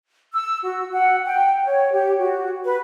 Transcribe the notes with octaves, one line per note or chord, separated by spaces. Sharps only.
E6
F#4
F#5
G5
C#5
G4
F#4
B4